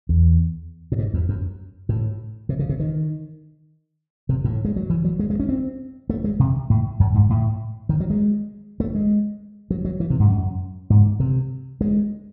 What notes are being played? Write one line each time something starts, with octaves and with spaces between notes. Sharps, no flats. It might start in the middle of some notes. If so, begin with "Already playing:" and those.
E2
A2
G#2
E2
F#2
A2
C3
C#3
C3
D#3
C3
A2
G#3
F#3
E3
F#3
G#3
G#3
C#4
C4
A3
G#3
C3
A2
F#2
G#2
A2
D#3
F#3
G#3
A3
G#3
F#3
F#3
E3
C3
G#2
F#2
G#2
C3
G#3